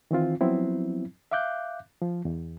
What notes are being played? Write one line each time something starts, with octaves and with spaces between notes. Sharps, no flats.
D#3 E3 C4 F4
F3 F#3 B3 C4 E4
E5 F5 D6 F#6 G6
F3
E2